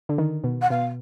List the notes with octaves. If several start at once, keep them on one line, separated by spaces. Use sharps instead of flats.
D3
D#3
B2
F#5
B2 F5